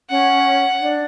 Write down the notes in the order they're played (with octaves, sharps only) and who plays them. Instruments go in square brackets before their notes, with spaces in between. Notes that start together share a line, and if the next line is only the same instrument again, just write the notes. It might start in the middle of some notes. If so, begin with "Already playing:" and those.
[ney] C#4 [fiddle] F#5
[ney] D4